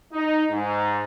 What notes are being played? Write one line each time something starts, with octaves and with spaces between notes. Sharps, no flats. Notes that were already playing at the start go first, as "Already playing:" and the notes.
D#4
G#2